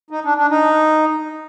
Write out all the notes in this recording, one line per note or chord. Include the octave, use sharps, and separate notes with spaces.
D#4
D4
D4
D#4